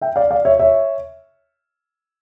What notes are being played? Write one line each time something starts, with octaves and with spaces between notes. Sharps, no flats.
E5 G5
D5 F5
D5 F5
C#5 E5
C#5 E5